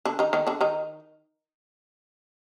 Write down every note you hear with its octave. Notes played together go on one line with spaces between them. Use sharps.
D3 D4
D#3 D#4
D#3 D#4
D3 D4
D#3 D#4